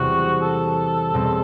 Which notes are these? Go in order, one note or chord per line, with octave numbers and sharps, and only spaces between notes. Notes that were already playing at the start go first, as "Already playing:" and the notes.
Already playing: E2 C3 G3 C4 E4 F#4
A4
E2 B2 G3 C4